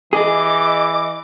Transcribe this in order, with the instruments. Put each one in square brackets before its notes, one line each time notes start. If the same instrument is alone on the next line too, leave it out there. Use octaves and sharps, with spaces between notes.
[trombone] E3 [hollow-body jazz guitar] G#4 [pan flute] D#5 [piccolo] D6